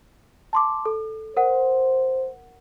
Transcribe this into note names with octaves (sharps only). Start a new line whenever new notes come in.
A5 C6 D6
A4
A#4 C5 F#5